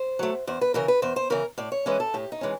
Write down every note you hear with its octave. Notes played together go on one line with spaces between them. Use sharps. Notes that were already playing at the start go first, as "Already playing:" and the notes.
Already playing: C5
F#3 A3
E2 C5
B4
C#3 E3 A#4
B4
E2 C5
C5
C#3 E3 A#4
A2 D5
C#5
E3 G#3 C#4 B4
A4
A2 G4
D#4
E3 G#3 C#4